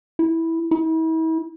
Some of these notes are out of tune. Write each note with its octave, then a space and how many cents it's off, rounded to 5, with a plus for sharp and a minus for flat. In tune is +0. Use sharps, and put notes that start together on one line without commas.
E4 -10
E4 -40